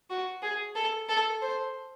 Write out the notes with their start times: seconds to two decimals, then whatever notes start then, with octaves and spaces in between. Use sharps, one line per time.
0.10 F#4
0.43 G#4
0.76 A4
1.09 A4
1.42 C5